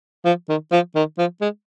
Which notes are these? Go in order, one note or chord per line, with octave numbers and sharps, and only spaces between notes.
F3
D#3
F3
D#3
F3
G#3